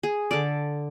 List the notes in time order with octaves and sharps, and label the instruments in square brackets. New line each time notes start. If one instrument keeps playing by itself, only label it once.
[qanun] G#4
D3 A4 D5